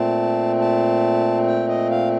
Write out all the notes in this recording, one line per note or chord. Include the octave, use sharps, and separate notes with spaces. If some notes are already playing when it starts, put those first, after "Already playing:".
Already playing: A#2 A3 C4 A5
A5
G5
D#5
F5